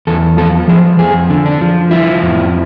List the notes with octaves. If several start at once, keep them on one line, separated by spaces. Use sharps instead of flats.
E2 A4
F3 A4
F3 G#4
F2 G#4
D3
D4
F3
F3 E4
F2